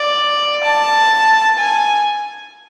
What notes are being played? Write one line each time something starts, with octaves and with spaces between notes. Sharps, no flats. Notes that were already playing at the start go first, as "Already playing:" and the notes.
Already playing: D5
A5
G#5